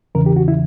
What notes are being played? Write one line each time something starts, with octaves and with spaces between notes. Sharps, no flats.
E2 C#3 E3 A#4
G4
F#4
E4